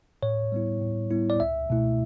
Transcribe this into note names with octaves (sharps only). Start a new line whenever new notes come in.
A2 C#5
G3 B3 E4
A2
G3 B3 E4
D5
C#2 E5
B2 A3 E4